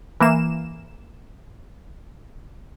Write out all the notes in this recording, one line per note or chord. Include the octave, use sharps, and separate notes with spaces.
E3 A#3 E7